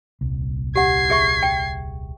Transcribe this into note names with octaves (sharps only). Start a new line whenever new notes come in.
D#1 C2
G4 F#5 G#6 C7
G#4 E5 C#6
G5